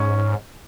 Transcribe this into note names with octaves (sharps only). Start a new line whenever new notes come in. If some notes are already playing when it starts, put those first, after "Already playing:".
Already playing: G#2 C#4